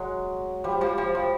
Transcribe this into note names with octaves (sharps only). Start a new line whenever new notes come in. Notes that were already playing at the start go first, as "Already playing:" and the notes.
Already playing: F#3 G#3
F3 G3
F3 G3
F3 G3
F3